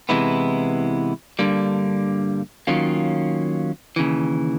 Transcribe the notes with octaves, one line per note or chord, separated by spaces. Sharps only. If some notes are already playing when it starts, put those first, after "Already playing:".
C3 E3 G#3 B3 E4
G2 D3 G3 A#3
D#3 F#3 A#3 C#4 F4
D#2 C#3 E3